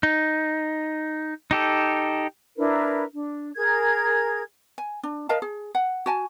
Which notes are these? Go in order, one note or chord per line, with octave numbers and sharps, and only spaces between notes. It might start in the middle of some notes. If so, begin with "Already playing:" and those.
D#4
D#4 G4 A4
D4 E4 A#4 B4
D4
G#4 A#4 G#6
G#5
D4
A#4 D#5 F5 A5
G#4
F#5
F#4 G#5 A5